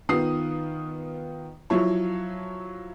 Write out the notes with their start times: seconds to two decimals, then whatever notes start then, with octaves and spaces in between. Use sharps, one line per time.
0.09 D#3 B3 F4 D#6 C7
1.70 F3 F#3 E4 F4 C#5